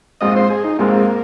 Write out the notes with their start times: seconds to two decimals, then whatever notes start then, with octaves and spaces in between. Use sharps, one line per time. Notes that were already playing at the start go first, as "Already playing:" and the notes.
0.21 A#1 G#2 G#3 C4 F4 D#5
0.36 C5
0.50 G#4
0.64 D#4
0.79 A#1 G#2 G#3 A#3 C4 F4